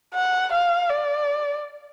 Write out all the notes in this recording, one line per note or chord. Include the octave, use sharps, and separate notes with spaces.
F#5
F5
D5